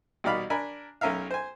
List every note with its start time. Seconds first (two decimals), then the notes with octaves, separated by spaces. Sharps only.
0.24 C2 B2 D#4 D5 F5 B5
0.50 D4 A#4 G#5 B5
1.01 B1 C#4 A#4 E5 F5
1.31 C5 G#5